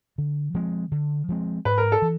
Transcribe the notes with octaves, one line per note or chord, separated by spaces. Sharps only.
D3
F3 G#3 C4
D3
F3 G#3 C4
G#2 B4
A#4
A4
E3